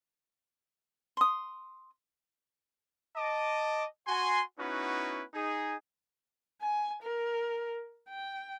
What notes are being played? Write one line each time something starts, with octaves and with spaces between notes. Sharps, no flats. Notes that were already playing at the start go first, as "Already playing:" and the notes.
C6 D#6
D#5 A5 D6
F#4 G#5 C6
B3 C#4 D#4 E4 F#4 B4
D#4 G#4
G#5
A#4
G5